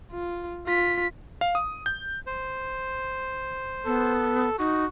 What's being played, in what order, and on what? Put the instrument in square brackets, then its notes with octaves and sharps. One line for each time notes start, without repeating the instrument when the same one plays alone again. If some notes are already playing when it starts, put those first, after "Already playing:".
[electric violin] F4
F4 B6
[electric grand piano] F5
D#6
G6
[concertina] C5
[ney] B3 [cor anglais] A4
[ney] D#4 [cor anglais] F#4